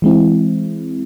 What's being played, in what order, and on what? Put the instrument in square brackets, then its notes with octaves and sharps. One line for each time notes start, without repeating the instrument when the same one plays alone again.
[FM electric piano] E3 G#3 C4 E4